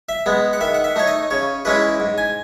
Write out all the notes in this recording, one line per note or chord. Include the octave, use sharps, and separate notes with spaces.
E5
G#3 B3
F#5
D#3 E5
F#5
E5
A3 D#4 C#5
D#5
C#3 C#5
E3 G#3 C#4 E4 B4
G#2
G#5